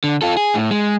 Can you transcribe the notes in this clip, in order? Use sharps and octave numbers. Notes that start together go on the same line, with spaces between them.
D3
F4 A4
G#4
A2
G#3